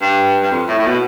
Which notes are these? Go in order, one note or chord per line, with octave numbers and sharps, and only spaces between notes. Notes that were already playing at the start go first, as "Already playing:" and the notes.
G2
G2
F2
A2
A2
B2